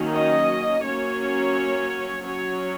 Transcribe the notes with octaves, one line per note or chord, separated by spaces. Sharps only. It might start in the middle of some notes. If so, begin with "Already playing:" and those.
Already playing: D#3 F#3 A#3 C#4
D#5
F#3 A#3 C#4 C#5
F#3 C#4 C#5